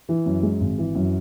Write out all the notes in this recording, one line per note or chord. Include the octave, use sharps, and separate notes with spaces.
E3
F#2
G#3
G#1
E3
F#2